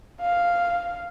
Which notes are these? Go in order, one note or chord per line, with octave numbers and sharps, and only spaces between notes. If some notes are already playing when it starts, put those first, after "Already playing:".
F5